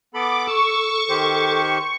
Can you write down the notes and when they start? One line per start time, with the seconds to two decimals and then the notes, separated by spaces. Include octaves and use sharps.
0.14 B3 A4 B5 D6
0.47 A4 C#6 E6
1.09 D#3 G4 C5